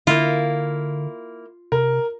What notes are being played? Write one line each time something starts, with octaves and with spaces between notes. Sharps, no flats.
D3 A#3 E4 F4
C3 A#4